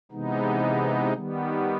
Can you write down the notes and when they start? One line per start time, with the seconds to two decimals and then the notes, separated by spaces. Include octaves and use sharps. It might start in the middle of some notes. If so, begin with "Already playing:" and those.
0.12 C3 E3 G#3 B3 D#4
1.13 D#3 G3 B3